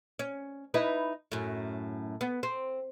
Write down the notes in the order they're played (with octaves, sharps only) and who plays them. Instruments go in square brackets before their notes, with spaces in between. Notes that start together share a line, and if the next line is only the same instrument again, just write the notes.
[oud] C#4
D#4 E4 B4
F#2 A2
B3
C4